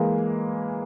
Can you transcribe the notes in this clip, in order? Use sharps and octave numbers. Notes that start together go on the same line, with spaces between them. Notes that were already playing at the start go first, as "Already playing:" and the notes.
Already playing: E3 G#3 A#3